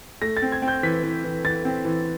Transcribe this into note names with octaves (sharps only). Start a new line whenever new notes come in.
A3 A#6
A6
C4
G#6
C4
G6
E3 B6
E3
E3
E3 A6
C4
E3